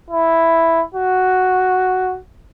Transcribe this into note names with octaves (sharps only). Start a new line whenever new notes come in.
E4
F#4